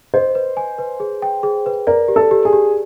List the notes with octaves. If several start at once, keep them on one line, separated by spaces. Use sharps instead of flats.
C5 D#5
B4
G#5
B4
G#4
G5
G#4
B4
A#4 D5
G4
A4
G4
G#4
G4